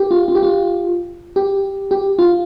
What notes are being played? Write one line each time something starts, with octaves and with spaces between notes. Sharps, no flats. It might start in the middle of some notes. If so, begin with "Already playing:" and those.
Already playing: G4
F4
F4
G4
F4
G4
G4
F4